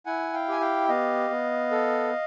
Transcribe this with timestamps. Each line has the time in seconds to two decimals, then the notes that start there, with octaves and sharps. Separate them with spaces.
0.06 E4 F#5 G#5
0.33 F5 G5
0.48 G4 G#5
0.61 F5 G5
0.89 B3 D#5 F5
1.30 B3
1.71 A4